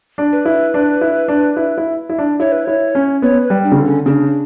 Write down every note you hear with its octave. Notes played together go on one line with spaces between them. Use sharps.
D4
B4
E4
D4
E4
D4
E4
E4
E4
D4
E4 C#5
B4
E4 C#5
C#4
B3 C#5
B4
G3
D4
C#3
D3
C#4
C#3 D4